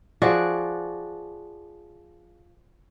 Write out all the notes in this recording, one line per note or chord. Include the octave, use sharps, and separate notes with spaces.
F3 F#4 G#4 D5